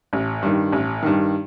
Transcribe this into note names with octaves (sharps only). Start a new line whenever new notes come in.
A1
G2 D#3
A1
G2 D#3